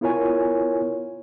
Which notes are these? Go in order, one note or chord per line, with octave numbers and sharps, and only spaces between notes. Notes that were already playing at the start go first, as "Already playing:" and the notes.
B3 E4 F4 A#4 C#5 G#5